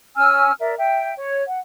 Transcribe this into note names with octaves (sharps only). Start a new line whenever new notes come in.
C#4 G#5 E6 F6
A#4 D5 E5
E5 G5
C#5
F#5